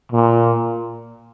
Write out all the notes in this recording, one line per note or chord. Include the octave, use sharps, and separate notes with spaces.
A#2